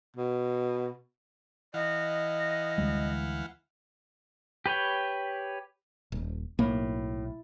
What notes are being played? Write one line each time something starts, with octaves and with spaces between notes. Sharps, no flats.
B2
E3 D#5 F5 F#5
D2 G3 G#3
G4 B4 C#5 G5
D#1
B1 A2 A#3